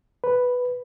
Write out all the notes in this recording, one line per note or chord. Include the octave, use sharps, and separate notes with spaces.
B4